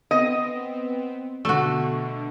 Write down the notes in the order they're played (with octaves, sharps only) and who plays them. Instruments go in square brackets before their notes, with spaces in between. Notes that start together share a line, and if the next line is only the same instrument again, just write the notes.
[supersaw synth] B3 C4 [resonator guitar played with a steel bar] D#5
[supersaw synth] B2 D3 [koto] A3 F#4